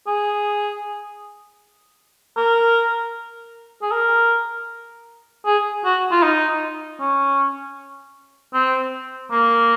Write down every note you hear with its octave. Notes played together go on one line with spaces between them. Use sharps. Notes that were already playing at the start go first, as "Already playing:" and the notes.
G#4
A#4
G#4
A#4
G#4
F#4
F4
D#4
C#4
C4
A#3